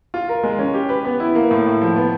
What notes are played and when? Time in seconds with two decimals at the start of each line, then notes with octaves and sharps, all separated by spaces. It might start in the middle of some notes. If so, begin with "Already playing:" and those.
0.14 F4
0.29 A#4
0.43 G#3
0.59 C#4
0.74 G4
0.89 B4
1.05 B3
1.20 E4
1.35 A#3
1.51 A2
1.66 A2
1.81 F3
1.96 B3